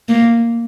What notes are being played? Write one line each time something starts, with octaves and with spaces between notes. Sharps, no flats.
A#3